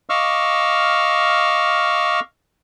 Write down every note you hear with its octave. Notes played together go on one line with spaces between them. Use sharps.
D#5 F5 C#6 D6 E6 F6